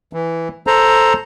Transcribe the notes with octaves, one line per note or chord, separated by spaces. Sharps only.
E3
A4 C5 A#5